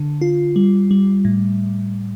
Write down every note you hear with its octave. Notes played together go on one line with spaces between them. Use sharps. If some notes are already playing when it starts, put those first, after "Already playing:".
Already playing: D3
F4
G3
G3
A2